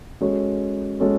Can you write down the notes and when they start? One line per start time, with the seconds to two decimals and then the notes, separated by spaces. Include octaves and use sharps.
0.21 G#3 C#4 F#4 A4 C#5
1.00 G#3 C#4 F#4 A4 C#5